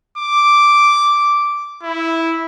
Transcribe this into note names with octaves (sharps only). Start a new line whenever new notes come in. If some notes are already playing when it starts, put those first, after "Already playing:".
D6
E4